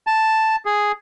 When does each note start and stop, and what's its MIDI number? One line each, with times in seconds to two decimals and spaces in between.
0.07 0.56 81
0.65 0.92 68